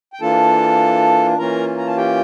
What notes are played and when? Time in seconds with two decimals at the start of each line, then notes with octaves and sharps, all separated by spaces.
0.13 G5
0.21 E3 A#3 D4 F4 A4 A5
1.38 E3 A#3 C#4 F4 A#4 A#5
1.77 A#5
1.87 A5
1.97 G4 G5